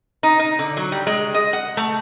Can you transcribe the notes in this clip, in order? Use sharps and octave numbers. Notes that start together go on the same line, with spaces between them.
D#4
D#4
D3
F#3
G3
G#3
D#5
F#5
A3